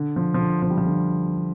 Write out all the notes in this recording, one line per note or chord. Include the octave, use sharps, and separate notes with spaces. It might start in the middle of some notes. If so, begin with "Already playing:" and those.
Already playing: D3
F3
F3
D3
F3
G3
F3
D3